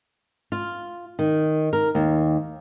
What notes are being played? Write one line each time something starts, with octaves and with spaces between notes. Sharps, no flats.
F4
D#3
A#4
D#2